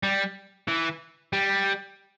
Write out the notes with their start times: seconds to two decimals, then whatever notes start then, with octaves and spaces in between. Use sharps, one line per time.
0.03 G3
0.68 E3
1.33 G3